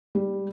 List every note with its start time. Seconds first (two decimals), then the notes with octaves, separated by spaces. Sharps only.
0.15 G3